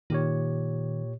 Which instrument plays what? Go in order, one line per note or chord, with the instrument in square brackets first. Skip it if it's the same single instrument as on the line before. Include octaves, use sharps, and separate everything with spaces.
[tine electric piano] A#2 G4 C#5 [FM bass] D#3